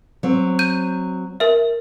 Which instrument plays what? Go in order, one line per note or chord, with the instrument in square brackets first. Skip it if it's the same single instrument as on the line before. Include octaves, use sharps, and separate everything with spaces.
[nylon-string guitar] F#3 C4
[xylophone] G6 D#7
A#4 E5